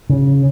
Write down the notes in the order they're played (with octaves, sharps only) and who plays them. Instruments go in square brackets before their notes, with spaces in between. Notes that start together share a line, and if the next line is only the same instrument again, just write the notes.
[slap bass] C#3